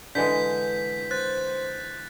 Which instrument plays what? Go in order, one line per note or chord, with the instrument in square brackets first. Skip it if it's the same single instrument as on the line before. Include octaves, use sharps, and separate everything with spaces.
[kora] D3 E3 G#3 [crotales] G6 B6
[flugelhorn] C5 [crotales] F#6 A6